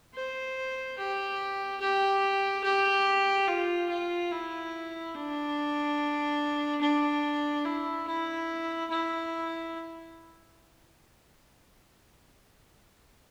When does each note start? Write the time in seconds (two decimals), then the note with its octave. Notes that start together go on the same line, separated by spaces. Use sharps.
0.14 C5
0.98 G4
1.80 G4
2.64 G4
3.47 F4
3.89 F4
4.31 E4
5.15 D4
6.81 D4
7.65 E4
8.07 E4
8.90 E4